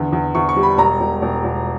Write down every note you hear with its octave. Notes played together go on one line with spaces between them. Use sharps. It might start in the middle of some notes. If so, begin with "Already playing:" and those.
Already playing: E2 D3
E2
E2 C#6
C#6
G3
B5
E1 A#5
E1
E1
E1